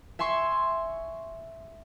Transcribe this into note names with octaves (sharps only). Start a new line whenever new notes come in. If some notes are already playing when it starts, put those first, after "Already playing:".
E5 G#5 C6 C#6